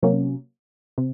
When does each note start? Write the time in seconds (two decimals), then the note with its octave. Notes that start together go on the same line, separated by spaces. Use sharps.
0.03 C3 F#3 A#3 C#4
0.98 C3